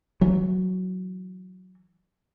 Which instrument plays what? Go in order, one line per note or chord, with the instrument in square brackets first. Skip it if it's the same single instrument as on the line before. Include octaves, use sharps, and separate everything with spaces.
[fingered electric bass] E3 F#3